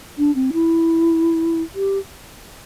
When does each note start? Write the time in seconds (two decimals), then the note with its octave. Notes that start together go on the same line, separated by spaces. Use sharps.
0.18 D4
0.35 C4
0.53 E4
1.75 G4